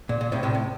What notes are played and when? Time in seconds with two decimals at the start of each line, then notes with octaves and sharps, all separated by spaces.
0.09 A#2
0.21 A#2
0.32 A2 C3
0.43 A2 C3
0.55 A2